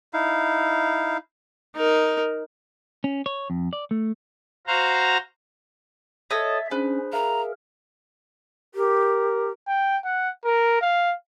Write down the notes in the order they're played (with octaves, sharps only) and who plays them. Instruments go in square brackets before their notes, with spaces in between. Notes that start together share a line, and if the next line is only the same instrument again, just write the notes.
[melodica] D#4 E4 F5
[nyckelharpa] D#4 A#4
[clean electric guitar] C#4
C#5
F2
D5
A3
[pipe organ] F#4 C5 F5 A#5
[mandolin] A4 C#5 D#5 [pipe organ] E5
[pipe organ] C#4 [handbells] D4 G#4 C5 [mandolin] B4
[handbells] G#4 E5 F5 [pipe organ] A#4 [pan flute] A#5
[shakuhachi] G4 [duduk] A#4
[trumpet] G5
F#5
A#4
F5